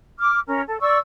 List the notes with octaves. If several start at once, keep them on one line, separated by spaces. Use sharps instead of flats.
D6 F6
C#4 A#4
A4
D5 C#6 E6